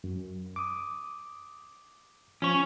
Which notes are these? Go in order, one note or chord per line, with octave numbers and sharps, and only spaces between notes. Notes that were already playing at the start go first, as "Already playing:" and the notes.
F#2
D6 D#6
F3 C#4 C#5